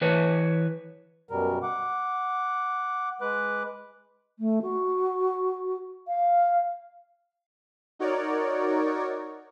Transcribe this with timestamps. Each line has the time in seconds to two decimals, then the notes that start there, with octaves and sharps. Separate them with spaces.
0.01 E3 B4 C#5
1.29 F#2 B2 G3 A#4
1.62 F#5 D6
3.21 G#3 B4 D6 F#6
4.39 A3
4.61 F#4
6.07 F5
7.99 D#4 F#4 A#4 C#5 D5